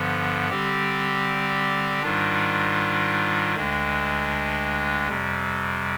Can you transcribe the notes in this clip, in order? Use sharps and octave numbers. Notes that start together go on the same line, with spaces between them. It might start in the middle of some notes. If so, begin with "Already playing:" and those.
Already playing: G2 D3 F3 B3
D3 G3 C4 G4
G#2 D#3 G3 D4 F4
D2 D3 G#3 D4
F2 C3 G3